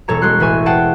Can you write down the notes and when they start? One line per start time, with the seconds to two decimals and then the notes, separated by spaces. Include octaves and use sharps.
0.08 E1 A4 C#5 A#5
0.22 G#3 C#4 F#4 C6 F#6
0.40 A1 B4 E5 G#5 C#6
0.66 G#4 C5 F#5 G5 A5